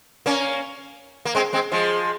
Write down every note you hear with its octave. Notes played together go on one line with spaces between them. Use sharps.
A#3 C#4
A#3
G#3 C4
G#3 C4
F3 G#3